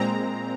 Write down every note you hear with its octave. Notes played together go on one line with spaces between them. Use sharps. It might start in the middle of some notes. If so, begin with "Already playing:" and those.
Already playing: A#2 G#3 C4 A#5